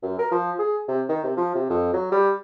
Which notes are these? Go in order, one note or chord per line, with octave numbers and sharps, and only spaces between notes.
F#2
A#4
F3
G#4
C3
D#3
C3
F3
C3
F2
F#3
G3